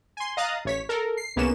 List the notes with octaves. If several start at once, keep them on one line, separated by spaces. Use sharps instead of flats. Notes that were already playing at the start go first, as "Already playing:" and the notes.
G#5 C6
D#5 F5 A#5 D#6 F#6 A6
A1 C#5 B6
A4 A#4
C7
C2 A#3 B3 C#4 G#4 E7